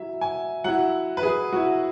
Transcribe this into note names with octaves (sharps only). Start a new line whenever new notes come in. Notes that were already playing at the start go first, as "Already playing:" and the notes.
Already playing: F#3 E4 E5
G#5
F#3 E4 F#5
B4
G#4
F#3 E4 F#4